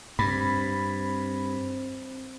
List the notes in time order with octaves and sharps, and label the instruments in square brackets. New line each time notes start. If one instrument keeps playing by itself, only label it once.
[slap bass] G2 [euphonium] C4 [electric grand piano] B5